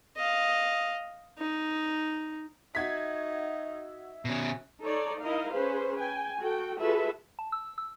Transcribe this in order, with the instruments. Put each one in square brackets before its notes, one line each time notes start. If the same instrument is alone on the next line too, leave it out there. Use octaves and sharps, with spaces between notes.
[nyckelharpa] D#5 F5
D#4
[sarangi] D#4 [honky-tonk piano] F#4 G#6 B6 [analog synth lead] E5
[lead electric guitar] B2 C#4 [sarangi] F#4
[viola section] D#4 A4 C#5 D5
D#4 E4 A#4 D#5 F5
C#4 G#4 B4 C5
G5 G#5
F#4 A4 G5
F4 F#4 G#4 A4 B4 E5
[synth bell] A5
E6
E6